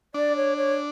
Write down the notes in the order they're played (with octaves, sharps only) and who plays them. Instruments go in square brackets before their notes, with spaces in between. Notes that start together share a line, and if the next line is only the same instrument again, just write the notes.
[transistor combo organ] D4 [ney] D5
[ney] C#5
C#5